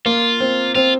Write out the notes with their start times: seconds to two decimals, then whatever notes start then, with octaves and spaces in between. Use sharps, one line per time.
0.06 A#3 F4
0.40 C4
0.75 C4 F4